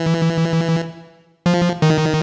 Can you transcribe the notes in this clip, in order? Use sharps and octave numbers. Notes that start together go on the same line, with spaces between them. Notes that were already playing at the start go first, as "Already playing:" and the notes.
Already playing: E3
F3
D#3